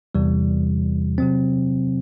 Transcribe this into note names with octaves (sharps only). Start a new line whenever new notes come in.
E2 C3 E3 G3
C3 F#3 C4